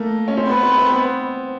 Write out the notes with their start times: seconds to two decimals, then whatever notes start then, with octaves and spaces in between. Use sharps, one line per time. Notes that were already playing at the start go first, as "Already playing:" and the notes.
Already playing: A3 A#3
0.28 C#4
0.37 C4
0.48 B3 B4
0.63 C4
0.78 C4
0.93 B3